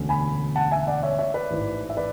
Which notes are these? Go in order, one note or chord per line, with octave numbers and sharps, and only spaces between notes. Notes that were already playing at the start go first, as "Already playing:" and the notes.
Already playing: E1 D2 D3 A3 C#4
G#5 B5
F#5 A5
E5 G#5
D5 F#5
C#5 E5
C#5 E5
B4 D5
A1 G#2 E3
E5
B4 D5